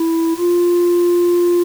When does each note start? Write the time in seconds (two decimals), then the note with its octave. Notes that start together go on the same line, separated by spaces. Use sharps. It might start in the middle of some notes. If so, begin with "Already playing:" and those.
Already playing: E4
0.39 F4